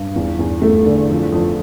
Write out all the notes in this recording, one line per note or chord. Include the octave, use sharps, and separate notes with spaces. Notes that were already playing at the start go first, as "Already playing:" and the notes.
Already playing: G2
E2
E2
E2 A3
D3
F2
F2